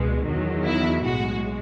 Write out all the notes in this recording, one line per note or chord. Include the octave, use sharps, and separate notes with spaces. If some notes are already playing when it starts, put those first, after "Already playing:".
Already playing: C#2 B2 G#3
E2 D#3 F#3
E4
B1 A2 G#3 F#4